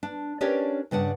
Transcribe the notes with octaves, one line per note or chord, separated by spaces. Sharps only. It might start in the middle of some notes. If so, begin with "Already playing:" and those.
D4
C#4 D4 G4 A#4 C#5 D5
G2 C#3 D4 F#5